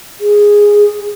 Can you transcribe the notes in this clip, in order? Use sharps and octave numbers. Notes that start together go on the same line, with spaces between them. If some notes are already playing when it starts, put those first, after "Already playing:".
G#4